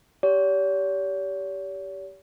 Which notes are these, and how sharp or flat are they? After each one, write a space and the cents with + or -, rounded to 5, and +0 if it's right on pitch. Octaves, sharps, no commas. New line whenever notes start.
G4 -5 C#5 +45